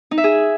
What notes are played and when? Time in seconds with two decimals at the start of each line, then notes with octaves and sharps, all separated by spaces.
0.11 D#4
0.18 E5
0.24 G#4